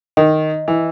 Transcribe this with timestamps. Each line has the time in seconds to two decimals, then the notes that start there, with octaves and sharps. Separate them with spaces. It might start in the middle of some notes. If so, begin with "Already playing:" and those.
0.17 D#3 D#5
0.68 E3